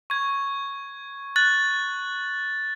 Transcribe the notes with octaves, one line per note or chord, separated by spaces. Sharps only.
C#6 G#6
F#6 A6 F#7